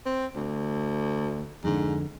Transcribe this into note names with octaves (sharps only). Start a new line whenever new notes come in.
C4
D2
F2 G#2 D3